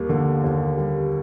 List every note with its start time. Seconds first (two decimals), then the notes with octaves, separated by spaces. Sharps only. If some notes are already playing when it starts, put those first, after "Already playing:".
Already playing: D#2 G3 A#3
0.09 D3
0.44 D#2
0.77 G3